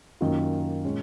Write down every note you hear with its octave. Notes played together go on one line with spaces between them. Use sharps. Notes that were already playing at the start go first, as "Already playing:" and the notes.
F#2 D#3 A#3 F4
A#2 G#3 C#4